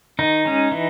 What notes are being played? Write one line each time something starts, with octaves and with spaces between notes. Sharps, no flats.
D#3 D#4
G#3 C#4
E3